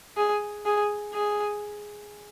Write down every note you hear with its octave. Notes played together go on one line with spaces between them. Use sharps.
G#4
G#4
G#4